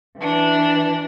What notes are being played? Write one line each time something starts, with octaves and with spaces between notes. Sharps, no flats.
E3 D4